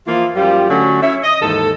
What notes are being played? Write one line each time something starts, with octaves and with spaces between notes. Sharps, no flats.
E3 F3 A#3 E4 F4
F#2 F3 G3 F4 G4
D3 F#3 A3 C#4 D4 F#4
C#4 E4 C#5 E5
D#5
D#2 G#2 E3 A4